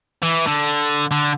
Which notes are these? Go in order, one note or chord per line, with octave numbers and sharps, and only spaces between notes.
E3
D3
D3